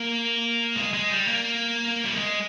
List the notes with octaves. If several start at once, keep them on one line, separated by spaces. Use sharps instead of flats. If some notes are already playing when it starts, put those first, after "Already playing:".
Already playing: A#3
G#3
G#3
G3
A#3
G3
G#3